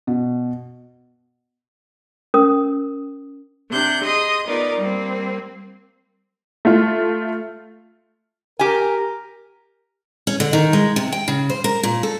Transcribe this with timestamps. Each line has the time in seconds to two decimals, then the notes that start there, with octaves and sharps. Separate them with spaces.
0.07 B2
2.34 C#4 A#4 D#6
3.71 C3 D4 F#6 G6
4.03 G#4 D#5 C6 D#6
4.47 B3 D#4 F4 A#4 D5
4.77 G3 A#3 C4
6.65 A3 F4
8.59 G4 A#4 G#5
10.27 C#4
10.40 D3
10.53 D#3
10.73 G#3
10.96 C3
11.12 G5
11.28 C#3
11.50 C5
11.64 A#4
11.83 A#2
12.03 A4